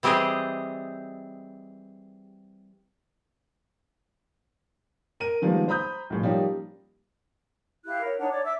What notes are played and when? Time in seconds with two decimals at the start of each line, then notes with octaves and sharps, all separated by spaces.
0.03 E3 G3 C4 G4 G#4 D#5
5.20 A#4 D#7
5.42 D#3 F3 G3 G#3 A#3 B3
5.68 C5 A#5 B5 D#6 G6
6.10 B1 A2 F3
6.23 F3 G3 A#3 C#4 D#4 G4
7.86 E4 G4 F5 F#6
8.02 A#4 C#5
8.19 D4 D#4 C#5 F#5
8.30 C#5 D5 D6
8.45 E5 D6 E6